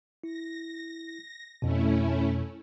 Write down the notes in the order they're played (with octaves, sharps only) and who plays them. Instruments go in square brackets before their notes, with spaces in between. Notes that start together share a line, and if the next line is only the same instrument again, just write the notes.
[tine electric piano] E4 [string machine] A#6
[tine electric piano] F2 B2 [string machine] A3 C#4 E4